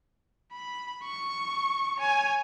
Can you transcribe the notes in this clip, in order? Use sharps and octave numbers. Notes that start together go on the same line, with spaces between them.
B5
C#6
C#5 G#5